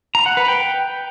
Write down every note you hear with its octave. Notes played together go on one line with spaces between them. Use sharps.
A#5
F#5
B4
G5